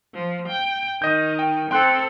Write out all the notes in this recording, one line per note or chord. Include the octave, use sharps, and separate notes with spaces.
F3
G5
D#3 D#5 G6
G5
C4 A4 G5 C6 F#6